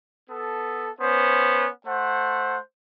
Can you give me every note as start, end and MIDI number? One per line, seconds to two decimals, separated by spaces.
0.30 0.90 59
0.30 0.90 69
1.01 1.67 59
1.01 1.67 61
1.01 1.67 72
1.87 2.57 57
1.87 2.57 72
1.87 2.57 78